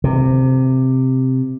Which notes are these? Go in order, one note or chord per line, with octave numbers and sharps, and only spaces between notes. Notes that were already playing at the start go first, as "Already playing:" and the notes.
C3